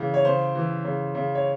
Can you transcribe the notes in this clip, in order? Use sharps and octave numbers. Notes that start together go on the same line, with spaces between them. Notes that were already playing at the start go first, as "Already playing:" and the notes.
Already playing: C#3 E3
C#5
C#3 C5
E3
C#3
C#3
C#5